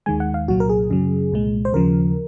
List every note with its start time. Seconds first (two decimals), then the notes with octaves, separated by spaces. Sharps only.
0.06 D#2 D#3 G#3 G#5
0.20 F#5
0.34 F5
0.48 C2 A#2 F#3 F#4
0.60 A#4
0.69 G#4
0.90 F#2 C#3 F#3
1.32 C2 A#2 G#3
1.65 C5
1.73 D#2 C#3 F3 A#4